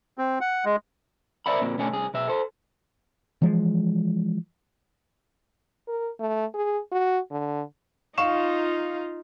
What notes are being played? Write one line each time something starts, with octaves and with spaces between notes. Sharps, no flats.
C4
F#5
G#3
A#4 C5 D5 E5 F#5 B5
A#2 A#3 C4
B2 D3 A3 C#4 C#5 G#5
C2 G#4
B1 B2 E5
A4 C5
E3 F3 G#3
A#4
A3
G#4
F#4
D3
D#4 F4 F5 C#6 E7